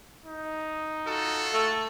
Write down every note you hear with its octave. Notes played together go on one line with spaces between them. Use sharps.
D#4
F4 F#4 A4
A3 A5